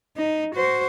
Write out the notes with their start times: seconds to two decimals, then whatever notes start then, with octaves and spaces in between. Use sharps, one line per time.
0.17 D#4
0.55 F#4 C5